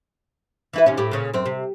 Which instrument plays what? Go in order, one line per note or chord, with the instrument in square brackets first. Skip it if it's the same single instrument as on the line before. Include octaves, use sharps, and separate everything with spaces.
[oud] E3 E4 B4
D#2 C3 C#4
A2 G4
A#2 C#3 C#5
F#2 C4
C3